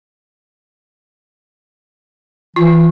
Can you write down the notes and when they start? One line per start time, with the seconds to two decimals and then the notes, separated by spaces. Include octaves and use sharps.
2.56 E3 F4